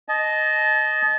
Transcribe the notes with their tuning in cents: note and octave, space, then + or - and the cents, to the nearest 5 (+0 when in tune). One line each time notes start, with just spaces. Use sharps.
D#5 +0 A5 -30